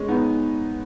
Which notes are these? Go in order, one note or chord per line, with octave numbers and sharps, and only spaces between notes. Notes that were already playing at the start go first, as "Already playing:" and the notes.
Already playing: G#3 C#4
B3 D#4